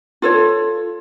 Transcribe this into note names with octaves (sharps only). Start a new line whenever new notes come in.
F4 A4 C#5